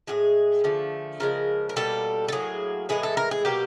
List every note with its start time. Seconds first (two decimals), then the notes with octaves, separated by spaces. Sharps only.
0.07 A2 F3 G#3 G#4
0.64 D3 F3 A3
1.20 C#3 F3 G#3 A#4
1.69 A#4
1.76 B2 G3 A#3 A4
2.28 A4
2.32 A2 F#3 A#3 G#4
2.89 A2 E3 G#3 G#4
3.03 A4
3.17 A#4
3.31 G#4
3.45 B2 F#3 A#3 G4